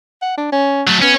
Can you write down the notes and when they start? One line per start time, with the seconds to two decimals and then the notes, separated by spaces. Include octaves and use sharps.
0.22 F#5
0.37 D4
0.52 C#4
0.87 F#3 A3
1.02 B3 C#4